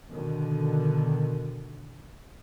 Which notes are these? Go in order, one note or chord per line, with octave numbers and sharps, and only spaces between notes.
B2 D3 D#3